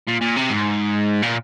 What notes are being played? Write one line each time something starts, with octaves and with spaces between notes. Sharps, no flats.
A#2
A#2
C3
G#2
A#2